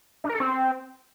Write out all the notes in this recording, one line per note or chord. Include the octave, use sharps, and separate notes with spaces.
D4
A#4
A4
C4